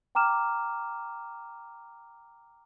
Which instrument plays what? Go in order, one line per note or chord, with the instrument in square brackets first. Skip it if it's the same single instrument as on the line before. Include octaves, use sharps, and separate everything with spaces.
[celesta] G5 A#5 D6 F6 E7